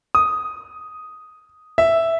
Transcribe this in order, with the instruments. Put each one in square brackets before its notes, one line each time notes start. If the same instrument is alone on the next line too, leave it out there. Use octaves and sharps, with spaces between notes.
[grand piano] D#6
E5